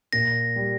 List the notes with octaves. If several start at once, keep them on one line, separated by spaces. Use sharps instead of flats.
A#2 A#6
G3